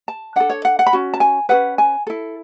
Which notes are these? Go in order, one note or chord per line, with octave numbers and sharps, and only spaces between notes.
A5
D4 A4 F#5
C#5
F#5
F#5
B5
C#4 F#4
A5
G#5
C#4 G#4 B4 F#5
G#5
E4 A4